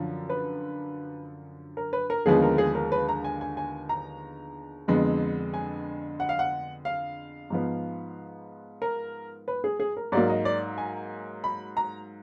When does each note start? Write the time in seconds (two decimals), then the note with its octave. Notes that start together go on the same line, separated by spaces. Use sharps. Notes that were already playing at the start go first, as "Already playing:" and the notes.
Already playing: F#2 D3 F3
0.29 B4
1.77 A#4
1.93 B4
2.10 A#4
2.26 D#2 D3 F3 G#3 B3 G#4
2.42 A#4
2.58 G#4
2.75 A#4
2.92 B4
3.09 A#5
3.24 G#5
3.41 G#5
3.57 G#5
3.89 A#5
4.88 F2 D3 G#3 B3
5.54 G#5
6.20 F#5
6.29 F5
6.39 F#5
6.85 F5
7.50 G#2 F3 B3
8.82 A#4
9.48 B4
9.64 G#4
9.80 G#4
9.97 A#4
10.12 G#2 F#3 A#3 D5
10.30 D#5
10.45 D5
10.78 G#5
11.44 B5
11.77 A#5